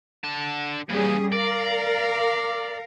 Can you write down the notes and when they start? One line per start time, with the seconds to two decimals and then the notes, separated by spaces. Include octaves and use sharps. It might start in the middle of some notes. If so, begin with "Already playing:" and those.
0.24 D3 A5
0.89 A#2 E3 G3 C#4 G#4
1.33 A#4 D5 F5